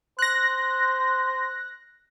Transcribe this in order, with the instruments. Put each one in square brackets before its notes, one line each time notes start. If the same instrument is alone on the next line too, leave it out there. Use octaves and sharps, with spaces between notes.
[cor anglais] C5 [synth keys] F#6 A#6